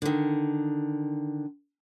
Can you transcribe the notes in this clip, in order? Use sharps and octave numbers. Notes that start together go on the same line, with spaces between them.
D3 D#3